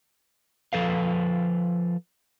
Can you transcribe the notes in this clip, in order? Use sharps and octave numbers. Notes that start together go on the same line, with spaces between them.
F3 A4 B4 F5